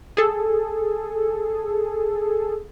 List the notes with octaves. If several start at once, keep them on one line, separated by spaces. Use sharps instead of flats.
G#4 A4